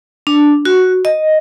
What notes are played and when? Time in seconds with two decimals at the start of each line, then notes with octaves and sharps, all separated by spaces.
0.27 D4
0.65 F#4
1.05 D#5